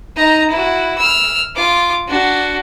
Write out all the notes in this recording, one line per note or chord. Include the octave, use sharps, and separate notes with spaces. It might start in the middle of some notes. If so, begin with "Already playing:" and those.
D#4 A#5
E4 F#4
E6 F6
F4 D6
D4 F#4